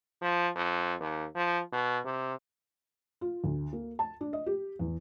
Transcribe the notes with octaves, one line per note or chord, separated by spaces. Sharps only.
F3
F2
D#2
F3
B2
C3
F4
D2
A#3
A5
D4
D#5
G4
E2